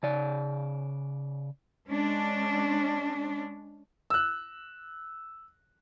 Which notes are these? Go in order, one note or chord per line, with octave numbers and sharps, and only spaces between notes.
C#3 D5
G#3 C#4 D4
E6 F#6